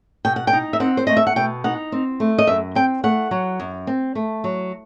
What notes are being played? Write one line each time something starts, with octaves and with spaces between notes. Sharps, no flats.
B2 G5
F#5
G5
D#4
E5
C4 F#5
C5
A3 D#5
E5
F#5
B2 G5
D#4 F#5
C4
A3
D#5
F#2 E5
C4 G5
A3 F#5
F#3
F#2
C4
A3
F#3